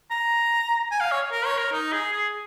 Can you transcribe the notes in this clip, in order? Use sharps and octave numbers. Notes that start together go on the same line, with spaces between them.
A#5
G#5
F5
C#5
A#4
C#5
A#4
D#4
G#4
G#4